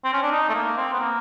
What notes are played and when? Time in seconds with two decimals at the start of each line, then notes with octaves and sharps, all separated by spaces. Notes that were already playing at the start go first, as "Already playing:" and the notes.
0.04 C4
0.13 C#4
0.23 D4
0.32 D#4
0.49 A3
0.54 A#3
0.77 C4
0.93 B3
1.00 A#3